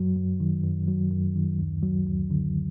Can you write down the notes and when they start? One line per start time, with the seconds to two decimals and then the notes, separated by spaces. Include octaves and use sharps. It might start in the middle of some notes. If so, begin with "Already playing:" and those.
Already playing: F#2 F#3
0.16 F#2
0.40 D#3
0.64 F#2
0.88 F#3
1.11 F#2
1.36 D#3
1.59 D2
1.83 F#3
2.07 D2
2.30 D3